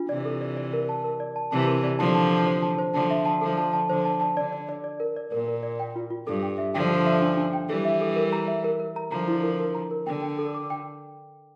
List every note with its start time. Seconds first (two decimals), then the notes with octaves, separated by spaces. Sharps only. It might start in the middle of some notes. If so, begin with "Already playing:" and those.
Already playing: D4 F4
0.09 C3 E3 D5
0.25 A4
0.41 D5
0.57 D5
0.73 A#4
0.89 A5
1.04 A#4
1.20 D5
1.36 A5
1.51 C3 E3 A5
1.67 A#4
1.84 D5
1.99 D3 F3 A5
2.15 A5
2.31 A5
2.47 C5
2.62 A5
2.79 C5
2.94 D3 F3 A5
3.10 E5
3.26 A5
3.41 D3 F3 A4
3.58 A5
3.73 A5
3.89 D3 F3 C5
4.05 A5
4.21 A5
4.37 D3 D5
4.52 D5
4.69 D5
4.84 D5
5.00 A#4
5.16 D5
5.32 A#2 A#4
5.48 A#4
5.63 D5
5.80 G5
5.96 F4
6.10 F4
6.27 G2 A4
6.43 G5
6.58 E5
6.74 D3 F3 G5
6.90 A4
7.06 E5
7.22 D4
7.37 D4
7.53 G5
7.69 E3 G3 A4
7.85 E5
8.01 A4
8.16 A#4
8.32 A#5
8.48 E5
8.64 A#4
8.80 A#4
8.96 A#5
9.11 D3 F3 A#5
9.28 E4
9.43 A#4
9.60 A#4
9.75 A#5
9.91 A#4
10.06 D3 G5
10.22 G5
10.39 A4
10.54 D6
10.70 G5